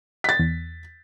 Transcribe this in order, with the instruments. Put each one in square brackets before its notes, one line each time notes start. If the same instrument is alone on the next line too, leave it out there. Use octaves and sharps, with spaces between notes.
[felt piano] A6 B6
[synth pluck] E2